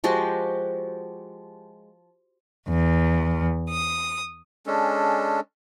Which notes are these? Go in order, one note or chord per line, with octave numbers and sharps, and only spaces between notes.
F3 G#3 F#4 G4
E2
D#6
G#3 C#4 D4 A4